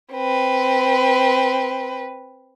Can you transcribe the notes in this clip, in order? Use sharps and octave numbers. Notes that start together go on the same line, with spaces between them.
C4 B4